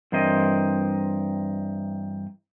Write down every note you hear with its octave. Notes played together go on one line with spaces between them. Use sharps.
G2 E3 C4 A#4 C5 D#5